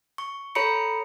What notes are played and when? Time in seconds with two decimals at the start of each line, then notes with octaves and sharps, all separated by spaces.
0.18 C#6
0.55 A4 C#5 A#5 B5 C#7